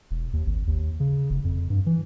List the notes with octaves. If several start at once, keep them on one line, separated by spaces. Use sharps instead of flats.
E1
D#2
G#1
D#2
C#3
F1
F2
G2
E3